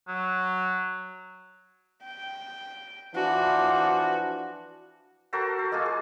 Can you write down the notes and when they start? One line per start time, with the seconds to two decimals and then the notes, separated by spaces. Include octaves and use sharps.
0.08 F#3
2.04 G5
3.15 E3 F3 D4 F#4
5.33 F#4 A4 A#4 C5
5.59 A4
5.72 G#3 A#3 F4 G#4
5.86 G#4